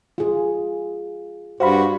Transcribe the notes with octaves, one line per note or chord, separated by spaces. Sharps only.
F4 G#4
G2 F#4 C5 F5 B5